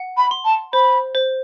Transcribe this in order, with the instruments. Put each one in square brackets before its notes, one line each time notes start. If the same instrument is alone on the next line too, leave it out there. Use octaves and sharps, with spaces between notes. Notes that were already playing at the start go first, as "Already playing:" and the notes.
Already playing: [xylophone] F#5
[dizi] B5
[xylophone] C6
[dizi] A5
[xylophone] C5 [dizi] B5
[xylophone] C5